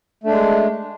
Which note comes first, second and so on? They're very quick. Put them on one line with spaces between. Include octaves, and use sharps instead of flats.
A3 D4 G#3